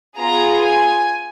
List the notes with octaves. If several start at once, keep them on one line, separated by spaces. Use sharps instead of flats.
B3 F4 G#4 A#5
G#5